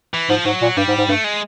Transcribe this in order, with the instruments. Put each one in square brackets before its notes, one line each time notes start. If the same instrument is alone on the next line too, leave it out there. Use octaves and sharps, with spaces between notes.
[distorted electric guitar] E3
[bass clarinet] G#2 [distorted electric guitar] F3
[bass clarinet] G#2 [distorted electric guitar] F#3
[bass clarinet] A#2
[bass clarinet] G2 [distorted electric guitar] G3
[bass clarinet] G#2
G#2
[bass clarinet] G2 [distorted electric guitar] A3
[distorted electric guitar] G#3